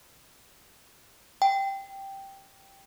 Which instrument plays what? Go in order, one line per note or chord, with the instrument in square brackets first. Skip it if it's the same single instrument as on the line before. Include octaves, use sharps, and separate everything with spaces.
[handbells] G5